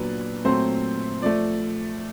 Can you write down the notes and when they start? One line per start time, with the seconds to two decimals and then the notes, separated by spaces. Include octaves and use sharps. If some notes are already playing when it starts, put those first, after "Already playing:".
Already playing: A#2 F#3 B3 D4 B4
0.44 A#2 F#3 A3 C4 C5
1.22 F3 A3 D5